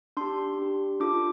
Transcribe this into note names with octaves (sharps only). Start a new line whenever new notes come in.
D4 G4 C6
D4 G4
D4 F4 A4 D6